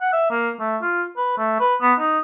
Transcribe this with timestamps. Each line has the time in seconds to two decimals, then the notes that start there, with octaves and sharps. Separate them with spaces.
0.01 F#5
0.13 E5
0.30 A#3
0.60 A3
0.82 F4
1.17 B4
1.38 A3
1.60 B4
1.81 B3
1.99 D#4